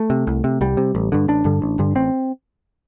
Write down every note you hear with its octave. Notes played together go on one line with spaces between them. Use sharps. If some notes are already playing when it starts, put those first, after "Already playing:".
Already playing: A3
C3
C2
C3
C2 G3
C3
A1
G2 D3
A1 D4
G2 D3
A1
G2 D3
A1 C4